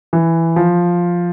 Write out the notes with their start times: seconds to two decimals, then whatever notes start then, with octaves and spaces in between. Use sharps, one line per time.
0.13 E3
0.56 F3